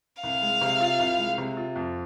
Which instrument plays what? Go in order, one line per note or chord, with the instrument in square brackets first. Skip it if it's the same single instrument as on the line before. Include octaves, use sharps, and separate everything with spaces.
[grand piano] C2 [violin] F5
[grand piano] G#3
C3
F4
C2
G#3
C3
F4
F2